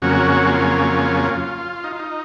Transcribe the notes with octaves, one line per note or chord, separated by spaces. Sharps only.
F2 C#3 F#3 A#3 C#4 F#4
F4
F4
D#4
F4
D#4